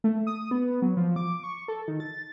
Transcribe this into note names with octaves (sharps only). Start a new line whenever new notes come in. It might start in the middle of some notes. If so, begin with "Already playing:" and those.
A3
D#6
B3
F#3
F3
D6
C#6
A4
D#3
A6